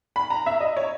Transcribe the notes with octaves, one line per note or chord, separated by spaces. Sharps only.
B5
A#5
E5
D#5
C#5